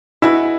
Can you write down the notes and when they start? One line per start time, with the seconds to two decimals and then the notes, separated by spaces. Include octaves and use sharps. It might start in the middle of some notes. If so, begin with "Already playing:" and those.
0.22 G#3 B3 E4 F#4 B4